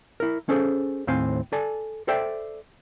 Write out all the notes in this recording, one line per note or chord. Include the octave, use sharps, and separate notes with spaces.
E4 A#4
C#4 G#4 A4 C5
D#2 A2 C4 C5 F5 G#5
A4 D5 G#5 A5
A4 C5 D5 E5 G5